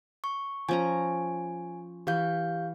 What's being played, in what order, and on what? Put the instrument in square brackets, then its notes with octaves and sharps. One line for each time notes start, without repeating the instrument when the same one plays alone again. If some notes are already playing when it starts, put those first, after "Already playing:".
[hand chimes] C#6
[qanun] F3 C#4 A#5 [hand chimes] G#5
[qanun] E3 [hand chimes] G4 F5 G6